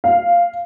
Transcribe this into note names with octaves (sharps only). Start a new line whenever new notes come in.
F5